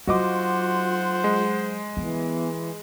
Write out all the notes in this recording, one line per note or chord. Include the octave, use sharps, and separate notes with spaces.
F#3 F4 F#4 C5 D#5 F#5 D6
G#3
E3 B3